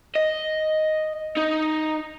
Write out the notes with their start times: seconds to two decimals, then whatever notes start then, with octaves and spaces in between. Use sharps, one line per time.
0.15 D#5
1.37 D#4